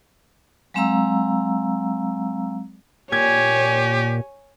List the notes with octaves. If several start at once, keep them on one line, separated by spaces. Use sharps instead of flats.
F#3 G#3 C4 F5 A#5 E6
A#2 G4 C#5 G#5 G#6